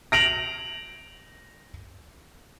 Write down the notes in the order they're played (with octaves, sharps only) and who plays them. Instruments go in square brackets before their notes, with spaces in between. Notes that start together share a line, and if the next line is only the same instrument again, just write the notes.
[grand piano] A#6 D7 F7 F#7